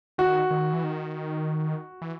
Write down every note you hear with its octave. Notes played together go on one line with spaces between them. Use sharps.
D#3 F#4
D#3
E3
D#3
E3